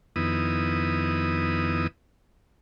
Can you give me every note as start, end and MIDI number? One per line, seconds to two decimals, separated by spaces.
0.16 1.87 41
0.16 1.87 51
0.16 1.87 59
0.16 1.87 64
0.16 1.87 87